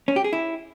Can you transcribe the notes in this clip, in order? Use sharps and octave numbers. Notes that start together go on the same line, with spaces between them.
C#4
G4
G#4
E4